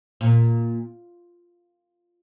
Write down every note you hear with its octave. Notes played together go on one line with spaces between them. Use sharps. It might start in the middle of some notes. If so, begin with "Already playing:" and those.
A#2